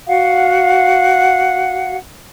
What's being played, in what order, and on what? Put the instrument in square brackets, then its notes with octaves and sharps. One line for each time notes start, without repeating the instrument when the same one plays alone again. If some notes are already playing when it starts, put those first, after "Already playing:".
[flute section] F#4 F5 F#5